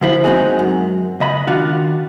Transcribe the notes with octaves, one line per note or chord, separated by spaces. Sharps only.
D3 F3 E4
G#3 B3 C4 D#4 F#4 G#4
F#2
C#2 D#5 B5
D#3 D4 F4 F#4